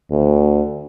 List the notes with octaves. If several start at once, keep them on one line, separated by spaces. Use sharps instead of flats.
D2